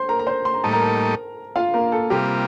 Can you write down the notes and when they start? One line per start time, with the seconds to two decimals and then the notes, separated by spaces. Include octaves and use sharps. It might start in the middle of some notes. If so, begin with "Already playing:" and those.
Already playing: C5 C6
0.09 A#4 A#5
0.19 A#5
0.27 C5 C6
0.45 C6
0.54 A#5
0.64 A2 G3 A#3 D#4 A4 A5
0.72 A#4 A#5
1.56 F4 F5
1.74 A#3 A#4
1.92 A4
2.10 C3 G3 A#3 F4 G4